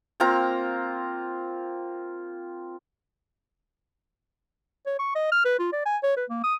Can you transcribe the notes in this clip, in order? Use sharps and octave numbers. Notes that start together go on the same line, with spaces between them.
A#3 C4 F4 A#5
C#5
C#6
D#5
F6
B4
F4
D5
G#5
C#5
B4
A#3
D#6